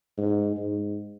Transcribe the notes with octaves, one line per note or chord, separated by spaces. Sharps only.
G#2
G#2